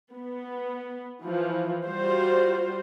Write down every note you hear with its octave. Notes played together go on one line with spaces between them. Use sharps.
B3
E3 F3
G3 F4 F#4 C5